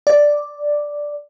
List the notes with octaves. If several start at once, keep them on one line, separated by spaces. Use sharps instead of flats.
D5